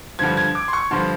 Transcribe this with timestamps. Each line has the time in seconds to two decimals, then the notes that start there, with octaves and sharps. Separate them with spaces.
0.19 G2 D3 F3 G#6
0.37 G#6
0.55 D6
0.68 C6
0.73 C#6
0.91 G2 D3 F3 C6